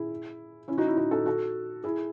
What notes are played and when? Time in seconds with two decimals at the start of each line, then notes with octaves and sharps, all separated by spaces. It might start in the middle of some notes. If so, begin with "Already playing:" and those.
Already playing: E4 G#4
0.68 C#4 E4
0.78 D#4 F#4
0.88 C#4 E4
0.97 D#4 F#4
1.11 F#4 A4
1.26 F#4 A4
1.84 E4 G#4